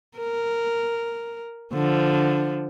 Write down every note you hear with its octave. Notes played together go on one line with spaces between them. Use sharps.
A#4
D3 F3